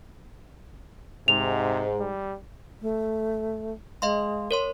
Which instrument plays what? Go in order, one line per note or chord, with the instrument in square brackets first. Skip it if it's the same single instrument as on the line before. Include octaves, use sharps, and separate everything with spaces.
[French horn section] G#2 [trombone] C3 [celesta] F7
[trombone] G3
[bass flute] A3
[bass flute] G#3 [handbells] D#5 F5 C6
[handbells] A#4 C#5 C6